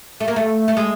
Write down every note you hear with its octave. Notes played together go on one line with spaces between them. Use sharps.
A3
A#3
A3
A3
G#3